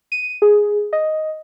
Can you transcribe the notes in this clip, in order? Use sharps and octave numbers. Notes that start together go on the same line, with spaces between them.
D#7
G#4
D#5